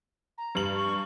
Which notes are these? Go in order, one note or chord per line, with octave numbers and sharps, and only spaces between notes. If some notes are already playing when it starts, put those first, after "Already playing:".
A#5
G2 F#7
C#6